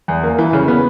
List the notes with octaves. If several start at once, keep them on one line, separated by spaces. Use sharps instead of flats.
E2
A#3
E3
C#3
B3